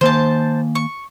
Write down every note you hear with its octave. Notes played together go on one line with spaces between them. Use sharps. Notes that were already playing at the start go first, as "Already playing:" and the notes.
D#3 A#3 C5 G#5 A5
C#6